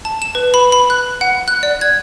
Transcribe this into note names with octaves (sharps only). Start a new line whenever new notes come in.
A5
E7
B4
B5
B5
F#6
F#5
F#6
D5
G#6